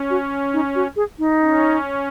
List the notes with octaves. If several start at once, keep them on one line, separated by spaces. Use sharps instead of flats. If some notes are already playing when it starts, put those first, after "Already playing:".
Already playing: C#4
F#4
D#4
F#4
G#4
D#4
C#4